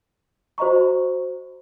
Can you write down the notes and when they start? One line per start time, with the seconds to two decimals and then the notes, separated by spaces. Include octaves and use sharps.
0.58 F#4 C5 D#5 A#5 C#6